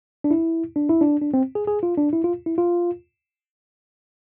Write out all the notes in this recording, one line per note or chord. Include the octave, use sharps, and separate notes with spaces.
D4
E4
D4
E4
D4
D4
C4
G#4
G#4
F4
D4
E4
F4
E4
F4